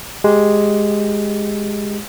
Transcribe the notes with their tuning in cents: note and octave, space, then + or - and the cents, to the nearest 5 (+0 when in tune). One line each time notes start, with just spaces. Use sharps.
G#3 +0 G4 +0